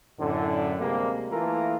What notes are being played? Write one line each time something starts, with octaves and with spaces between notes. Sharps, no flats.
F#2 A2 D3
D2 C3 G3 G#3 A#3
E3 A3 A#3 F4 A4 A#4